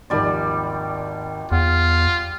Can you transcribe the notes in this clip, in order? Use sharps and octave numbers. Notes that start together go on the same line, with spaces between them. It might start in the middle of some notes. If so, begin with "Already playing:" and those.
G#1 D#2 F3 G3 D5
E2 F4 F#5